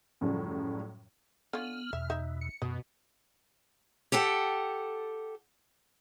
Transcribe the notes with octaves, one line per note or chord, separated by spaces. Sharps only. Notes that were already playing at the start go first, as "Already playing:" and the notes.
F#2 A2 C#3 F3 G3
D3 B3 C#4 F4 F6
E2 B2 E5
D#4 E5
C#7
F#2 B2 D#5
G4 A4 F#5 G5 A5